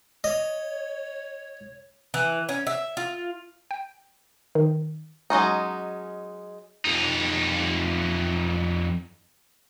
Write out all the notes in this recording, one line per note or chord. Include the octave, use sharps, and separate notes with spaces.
C#5 D#5
E3
C#4
E5
F4
G5
D#3
F#3 G#3 C#4 D#4
F2 D#4